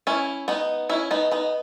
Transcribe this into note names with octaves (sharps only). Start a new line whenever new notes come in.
C#4 E4
B3 D#4
C#4 E4
B3 D#4
B3 D#4